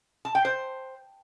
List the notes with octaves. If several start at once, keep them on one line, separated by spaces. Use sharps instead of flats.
A5
G5
C5